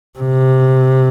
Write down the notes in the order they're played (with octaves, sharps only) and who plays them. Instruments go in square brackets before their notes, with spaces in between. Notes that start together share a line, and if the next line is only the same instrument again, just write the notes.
[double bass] C3